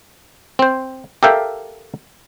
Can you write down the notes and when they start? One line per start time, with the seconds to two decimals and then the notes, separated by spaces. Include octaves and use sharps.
0.59 C4 C5
1.23 G4 A4 A#4 E5 F5 G5